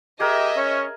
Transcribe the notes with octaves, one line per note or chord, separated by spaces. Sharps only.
G4 G#4 A#4 D#5 E5
C#4 C#5